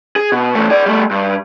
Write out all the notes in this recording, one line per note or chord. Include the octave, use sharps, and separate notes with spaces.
G#4
B2
E2 A3
G#4 D5
G3 A3
G2